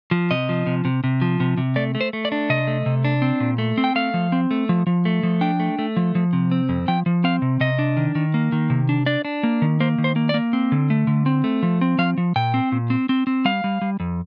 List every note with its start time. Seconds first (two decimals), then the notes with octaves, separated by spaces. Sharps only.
0.11 F3
0.31 C3 D#5
0.49 F3
0.67 C3
0.85 C3
1.04 C3
1.22 F3
1.40 C3
1.57 C3
1.76 A3 D5
1.95 A3
2.01 C5
2.13 A3
2.25 D5
2.32 D4
2.50 C3 D#5
2.67 A3
2.86 C3
3.05 D4
3.22 C4
3.40 A#2
3.58 A3
3.78 C4
3.84 G5
3.95 A3 F5
4.14 F3
4.32 C4
4.51 A3
4.69 F3
4.87 F3
5.05 A3
5.23 F3
5.41 D4 G5
5.60 A3
5.79 A3
5.97 F3
6.15 F3
6.33 C3
6.51 C4
6.69 F2
6.88 F3 G5
7.06 F3
7.24 C4 F5
7.42 C3
7.60 C3 D#5
7.79 D4
7.97 D#3
8.15 D#3
8.34 A#3
8.52 D#3
8.70 C3
8.89 D4
9.06 D4 D5
9.25 D4
9.43 A#3
9.62 D#3
9.80 A#3 C5
9.98 D#3
10.04 C5
10.16 A#3
10.29 D5
10.34 A#3
10.53 C4
10.72 D3
10.90 A3
11.07 D3
11.26 C4
11.44 A3
11.63 F3
11.81 C4
11.98 F3 F5
12.18 F3
12.36 A#2 G5
12.54 C4
12.72 A#2
12.90 C4
13.09 C4
13.27 C4
13.45 G3 F5
13.64 G3
13.81 G3
14.00 F2